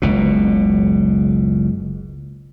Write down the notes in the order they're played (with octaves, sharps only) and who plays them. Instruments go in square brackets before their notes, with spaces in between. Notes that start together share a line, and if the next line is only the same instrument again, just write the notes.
[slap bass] F#1 C#2 B2